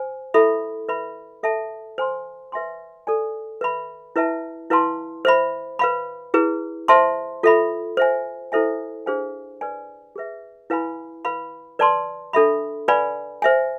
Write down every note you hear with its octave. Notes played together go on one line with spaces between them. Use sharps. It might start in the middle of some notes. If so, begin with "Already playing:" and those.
Already playing: C5 G#5
E4 A4 E5 B5
B4 E5 B5
A4 E5 A5
C5 G#5 C6
B4 E5 G#5 C6
A4 D5 G#5
B4 E5 B5
E4 B4 E5 A5
E4 B4 F5 A5 C6
C5 E5 B5
B4 F5 B5
E4 G#4 B4
C5 E5 A5 C6
F4 A4 E5 B5
C5 E5 G#5
E4 A4 C5 E5 G#5
D4 G#4 C5 F5 G#5
B4 D5 G#5
G#4 B4 E5
E4 B4 F5 G#5 B5
B4 F5 B5
B4 D5 A5 C6
D4 A4 E5 B5
B4 D5 F5 G#5 B5
C5 E5 G#5